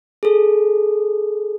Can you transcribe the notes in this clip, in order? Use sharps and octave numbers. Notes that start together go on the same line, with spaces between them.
G#4 A4